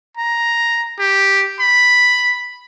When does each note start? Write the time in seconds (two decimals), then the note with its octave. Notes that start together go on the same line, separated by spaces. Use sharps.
0.17 A#5
0.99 G4
1.60 B5